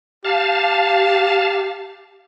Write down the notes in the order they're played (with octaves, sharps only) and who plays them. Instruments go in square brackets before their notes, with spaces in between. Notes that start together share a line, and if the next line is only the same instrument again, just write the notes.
[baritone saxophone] G4 [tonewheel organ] F5 A5